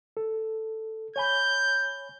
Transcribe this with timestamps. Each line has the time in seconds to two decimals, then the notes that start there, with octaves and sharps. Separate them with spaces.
0.17 A4
1.16 C#5 G#5 B5 G6